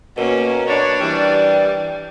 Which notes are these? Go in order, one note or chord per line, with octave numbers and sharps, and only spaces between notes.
B2 A#3 C#4 A#4
D4 B4 C#5
E3 G3